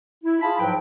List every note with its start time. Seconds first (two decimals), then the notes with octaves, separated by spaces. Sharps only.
0.23 E4
0.41 F4 G#4 F5 A5 B5
0.59 G#2 F3 F#3 B4 G5